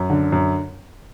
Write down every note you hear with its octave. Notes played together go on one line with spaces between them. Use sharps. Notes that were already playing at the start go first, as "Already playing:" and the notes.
Already playing: F#2
D3
F#2